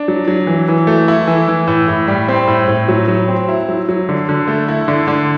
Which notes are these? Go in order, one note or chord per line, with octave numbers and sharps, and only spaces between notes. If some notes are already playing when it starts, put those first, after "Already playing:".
Already playing: D4
F#3
F#3
E3
E3
A3
E4
E3
E3
A2
A2
G3
C4
A2
A2
F#3
F#3
C4
E4
F#3
F#3
D3
D3
A3
E4
D3
D3